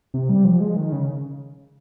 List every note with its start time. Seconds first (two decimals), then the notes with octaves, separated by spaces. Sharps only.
0.14 C3
0.29 G3
0.45 F3
0.60 G#3
0.76 D#3
0.92 C#3